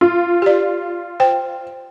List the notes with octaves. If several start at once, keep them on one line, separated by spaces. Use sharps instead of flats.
F4
G4 D5
C5 G5